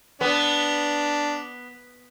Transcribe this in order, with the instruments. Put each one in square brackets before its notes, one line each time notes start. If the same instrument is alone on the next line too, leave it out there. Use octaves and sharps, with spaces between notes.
[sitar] B3 [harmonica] D4